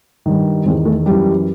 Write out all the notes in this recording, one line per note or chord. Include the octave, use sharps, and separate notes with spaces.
G2 D#3
E2 D#3 C4
A3
F#2 E3 G3